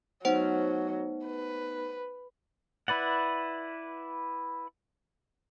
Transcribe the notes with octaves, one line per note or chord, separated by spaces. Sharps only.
F#3 A3 B3 D#4 C5 F#5
B4
E4 B4 D5 F#5